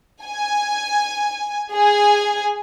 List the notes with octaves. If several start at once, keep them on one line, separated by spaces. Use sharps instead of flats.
G#5
G#4 G#5